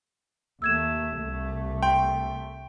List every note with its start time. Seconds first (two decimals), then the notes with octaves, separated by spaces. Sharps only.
0.62 D#2 A3 E6 G#6 E7
1.19 C2 A3
1.83 G5 C6